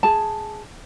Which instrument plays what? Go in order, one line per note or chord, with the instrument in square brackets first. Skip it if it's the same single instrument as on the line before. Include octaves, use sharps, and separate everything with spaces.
[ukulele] G#4 A5